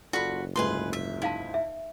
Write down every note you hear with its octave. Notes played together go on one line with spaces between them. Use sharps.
F#1 F4 F#4 A4 D5 B5
D2 G#2 F4 G#4 B4 C6
E5
D#4 E4 F5 A5
E5